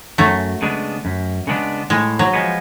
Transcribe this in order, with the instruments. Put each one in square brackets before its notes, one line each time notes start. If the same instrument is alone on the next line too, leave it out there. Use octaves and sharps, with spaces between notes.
[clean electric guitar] F#2 [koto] F#3 A3
[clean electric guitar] C#3 G#3 B3 D4
F#2
C#3 G#3 B3 D4
[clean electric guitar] A2 [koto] G#3
[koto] F#3
[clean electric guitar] F3 G#3 B3